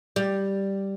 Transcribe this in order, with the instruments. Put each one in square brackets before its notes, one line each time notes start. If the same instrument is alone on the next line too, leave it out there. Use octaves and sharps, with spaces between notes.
[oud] G3